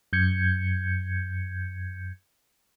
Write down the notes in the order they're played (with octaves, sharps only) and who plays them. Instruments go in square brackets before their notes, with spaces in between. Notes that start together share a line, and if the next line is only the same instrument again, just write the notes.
[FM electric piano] F#2 G6 G#6 C#7